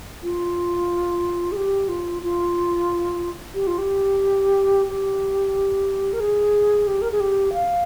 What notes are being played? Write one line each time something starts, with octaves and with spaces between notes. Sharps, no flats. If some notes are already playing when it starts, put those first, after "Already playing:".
F4
G#4
G4
F4
F4
G4
F4
G4
G4
A#4
G#4
G4
A#4
G#4
G4
F5